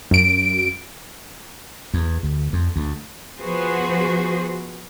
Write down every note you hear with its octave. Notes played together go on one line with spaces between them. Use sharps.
F#2 D7
E2
D2
F2
D2
F3 B3 F#4 G#4 C5